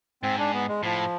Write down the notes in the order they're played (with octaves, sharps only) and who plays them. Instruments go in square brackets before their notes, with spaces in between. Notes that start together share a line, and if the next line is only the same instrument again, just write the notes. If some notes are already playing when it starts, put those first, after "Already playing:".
[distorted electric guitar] G#2 [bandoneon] C4
[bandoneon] D4
B3
G#3
[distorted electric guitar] A2 [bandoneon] F3